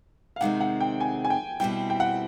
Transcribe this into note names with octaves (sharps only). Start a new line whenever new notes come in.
F5
C3 D#3 G#3 C4 F#5
F#5
G5
G#5
G#5
G5
B2 G3 C4 E4 G5
G5
F#5